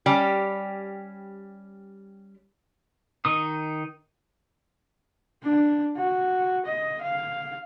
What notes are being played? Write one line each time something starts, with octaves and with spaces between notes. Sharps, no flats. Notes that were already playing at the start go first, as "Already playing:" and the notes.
G3 C#4 G4
D#3 D#4 D#6
D4
F#4
D#5
F5